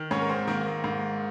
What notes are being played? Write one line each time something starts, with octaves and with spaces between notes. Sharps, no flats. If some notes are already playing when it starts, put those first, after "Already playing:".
Already playing: D#3
G#2 C#4 C#5
A#4
C4 C5
D#3 A#3 A#4
G#2